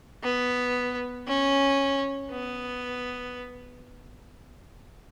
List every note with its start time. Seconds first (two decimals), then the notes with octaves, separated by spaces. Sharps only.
0.23 B3
1.27 C#4
2.31 B3